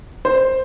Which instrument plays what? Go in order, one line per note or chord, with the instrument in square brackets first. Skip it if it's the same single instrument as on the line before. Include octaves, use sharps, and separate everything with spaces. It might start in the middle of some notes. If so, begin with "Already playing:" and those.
[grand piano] C5